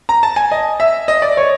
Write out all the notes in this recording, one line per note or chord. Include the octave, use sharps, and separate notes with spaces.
A#5
A5
G#5
D#5
E5
D#5
D5
C#5